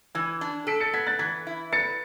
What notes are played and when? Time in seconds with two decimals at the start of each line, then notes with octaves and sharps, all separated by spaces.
0.15 E3 E6 G#6
0.41 D4
0.67 A4 B6 D7
0.80 A6 C#7
0.93 B3 G#6 B6
1.06 F#6 A6
1.19 E3 G#6 B6
1.47 E4
1.72 B4 A6 C#7